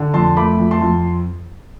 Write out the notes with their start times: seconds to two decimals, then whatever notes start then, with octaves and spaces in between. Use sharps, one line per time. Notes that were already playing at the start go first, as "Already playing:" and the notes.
Already playing: D3
0.14 F2 A5 C6
0.37 A3 B5 D6
0.60 F2
0.71 A5 C6
0.82 F2